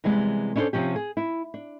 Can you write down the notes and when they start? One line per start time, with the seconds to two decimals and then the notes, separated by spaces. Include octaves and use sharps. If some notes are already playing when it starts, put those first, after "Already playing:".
0.04 C3 E3 G3 G#3 B3
0.55 C#4 D4 E4 F#4 A4 C5
0.73 C3 F3 C#4 G4
0.96 G#4
1.17 E4
1.54 D4